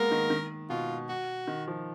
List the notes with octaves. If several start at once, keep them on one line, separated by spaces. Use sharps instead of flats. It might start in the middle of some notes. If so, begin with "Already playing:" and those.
Already playing: G#3 A#3 B3 A#4
D#3
D#3
B2 F4
F#4
D#3
F3